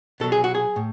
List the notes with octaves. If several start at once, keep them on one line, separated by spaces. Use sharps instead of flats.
B2 F#3 A4
G#4
F#4
G#4
A2